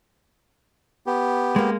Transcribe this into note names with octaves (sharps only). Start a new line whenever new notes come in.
B3 G4
G#3 A#3